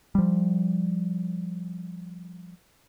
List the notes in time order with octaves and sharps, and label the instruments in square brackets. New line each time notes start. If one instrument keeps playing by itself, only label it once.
[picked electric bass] F3 G3